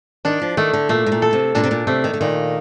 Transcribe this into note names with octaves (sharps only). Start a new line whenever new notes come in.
D#3 D4
F3
D#3 A3
D3
A#2 A3
A2
A#2
A4
C3
A#2 D4
C3
A#2
C3 A3
D#3
D3
A#2 D#3